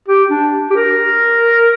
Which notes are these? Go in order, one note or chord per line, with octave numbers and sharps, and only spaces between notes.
G4
D4
G4
A#4